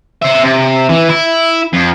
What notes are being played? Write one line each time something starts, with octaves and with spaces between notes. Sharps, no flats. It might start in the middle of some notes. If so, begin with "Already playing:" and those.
C5 E5
C3
E3
E4
F2